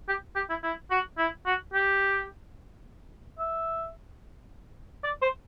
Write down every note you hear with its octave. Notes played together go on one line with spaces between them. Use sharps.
G4
G4
E4
E4
F#4
E4
F#4
G4
E5
D5
C5